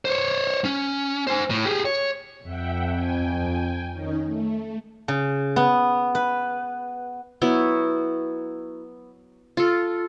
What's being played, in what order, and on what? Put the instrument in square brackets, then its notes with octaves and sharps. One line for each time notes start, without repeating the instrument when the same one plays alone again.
[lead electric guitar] C5 C#5
C#4
C5 G#5
A2
G4 G#4
C#5
[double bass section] F2 [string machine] E5 F#5 G5
[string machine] G5 G#5
D#3 C#4 D#4
A3
[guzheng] C#3
B3
B4
[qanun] F#3 B3 E4 F#4
F4 A4